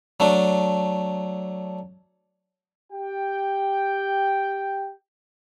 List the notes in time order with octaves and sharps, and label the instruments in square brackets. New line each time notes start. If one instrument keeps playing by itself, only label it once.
[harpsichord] F#3 A3 D4
[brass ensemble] G4 G5